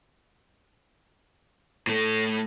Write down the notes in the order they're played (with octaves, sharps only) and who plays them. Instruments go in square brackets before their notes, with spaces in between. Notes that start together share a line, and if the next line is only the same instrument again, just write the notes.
[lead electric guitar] A2 A3